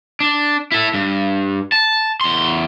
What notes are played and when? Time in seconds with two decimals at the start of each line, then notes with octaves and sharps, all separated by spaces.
0.20 D4
0.72 E4 A4
0.94 G2
1.72 A5
2.21 E2 C6